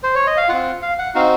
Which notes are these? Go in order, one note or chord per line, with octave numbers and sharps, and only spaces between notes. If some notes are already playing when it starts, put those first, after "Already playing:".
C5
C#5
D#5
F5
C4 F4 F#5
F5
F#5
C4 D#4 F#4 F5